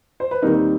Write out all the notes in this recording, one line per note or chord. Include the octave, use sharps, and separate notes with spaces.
C5
B4
D#2 D#3 G3 C4 D#4 A#4